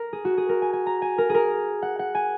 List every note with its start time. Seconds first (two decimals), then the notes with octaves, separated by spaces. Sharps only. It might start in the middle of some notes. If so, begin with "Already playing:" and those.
Already playing: A#4
0.13 G#4
0.25 F#4
0.38 G#4
0.49 A#4
0.62 G#5
0.73 G#5
0.86 A#5
1.02 G#5
1.18 A#4
1.29 G#4 A#4
1.83 F#5
1.99 F#5
2.15 G#5